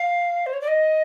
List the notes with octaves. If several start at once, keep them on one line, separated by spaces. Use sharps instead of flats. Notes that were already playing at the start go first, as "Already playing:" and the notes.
Already playing: F5
C5
C#5
D5
D#5